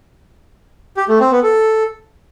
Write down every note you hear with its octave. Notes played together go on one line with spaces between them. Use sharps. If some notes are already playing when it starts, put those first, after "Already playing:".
G4
A3
C4
B3
A4